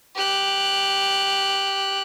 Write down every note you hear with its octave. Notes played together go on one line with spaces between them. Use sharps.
G4 F#6